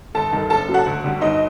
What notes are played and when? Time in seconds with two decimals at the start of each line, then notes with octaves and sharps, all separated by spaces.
0.15 G1 A4 A5
0.32 G2 D#3
0.50 F#1 A4 A5
0.68 F#2 F#3
0.74 F#4 F#5
0.86 D2
1.04 D3 G3
1.21 G1 D#4 D#5